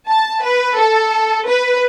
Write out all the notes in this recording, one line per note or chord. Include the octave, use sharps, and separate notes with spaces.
A5
B4
A4
B4